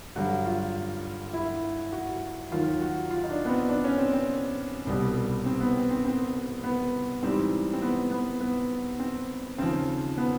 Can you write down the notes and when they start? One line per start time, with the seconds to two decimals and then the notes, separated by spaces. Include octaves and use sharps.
0.16 G2 D3 F#3 F#4
0.45 F4
1.33 E4
1.92 F#4
2.52 D#2 D#3 F#3 F4
2.81 F#4
3.11 F4
3.23 D#4
3.30 D4
3.45 B3
3.49 C4
3.69 D4
3.84 C#4
3.98 C4
4.13 C4
4.87 C2 B2 G3
5.46 C4
5.61 B3
5.76 C4
5.91 C4
6.05 C4
6.64 B3
7.23 G#2 E3 G3 C4
7.74 C4
7.82 B3
8.11 B3
8.41 B3
9.00 C4
9.58 D#2 C#3 F3 C4
10.18 B3